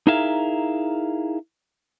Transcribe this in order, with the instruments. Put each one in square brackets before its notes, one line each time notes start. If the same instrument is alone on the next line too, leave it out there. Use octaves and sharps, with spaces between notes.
[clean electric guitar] D#4 E4 G#4 A#4 E5 F5